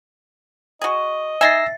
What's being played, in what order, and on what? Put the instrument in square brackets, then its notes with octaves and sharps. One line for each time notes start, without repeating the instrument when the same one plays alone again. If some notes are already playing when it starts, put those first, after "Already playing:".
[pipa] F#4 G#4 [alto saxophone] D#5
[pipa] D#4 G#5 [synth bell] E5 A6 [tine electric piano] E6 A#6 C7